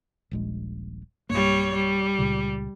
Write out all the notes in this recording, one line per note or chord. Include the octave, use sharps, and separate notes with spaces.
D#1 A#1 G#3
B1 G2 G3 A#3 C#5
G3
C#2 A#2 C#3